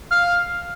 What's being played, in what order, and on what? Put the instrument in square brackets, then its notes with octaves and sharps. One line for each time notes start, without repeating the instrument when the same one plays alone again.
[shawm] F5